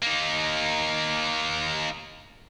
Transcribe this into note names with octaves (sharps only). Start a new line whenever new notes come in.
A#3 D#4